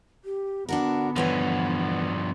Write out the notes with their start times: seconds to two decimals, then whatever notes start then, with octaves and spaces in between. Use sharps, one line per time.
0.25 G4
0.69 D3 B3 D4 F#4 A#4 F#5
1.16 G2 E3 F3 C#5 F#5 G#5